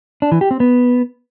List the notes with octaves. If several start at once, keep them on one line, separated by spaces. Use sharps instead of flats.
D4
E3
G4
C4
B3